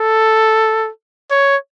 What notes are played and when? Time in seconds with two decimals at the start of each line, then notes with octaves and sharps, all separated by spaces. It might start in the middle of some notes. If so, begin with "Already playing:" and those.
Already playing: A4
1.31 C#5